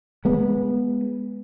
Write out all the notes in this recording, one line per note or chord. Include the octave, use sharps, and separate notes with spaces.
G#3 B3